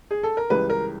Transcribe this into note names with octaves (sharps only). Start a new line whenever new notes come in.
G#4
A4
A#4
C#2 C#3 E3 G3 B4
A#4